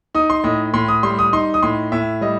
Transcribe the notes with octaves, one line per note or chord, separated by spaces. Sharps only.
D#4 D#6
C6
A2 D#5
A2 C6
D#6
G3 C6
D#6
D#4 C6
D#6
A2 C6
A2 E5
G3 D#5